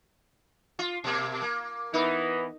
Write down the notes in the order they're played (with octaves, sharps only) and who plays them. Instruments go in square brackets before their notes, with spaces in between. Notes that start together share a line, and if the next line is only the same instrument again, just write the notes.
[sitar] F4
B2 A#3
A#3
[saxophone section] E3 B3 [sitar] D#4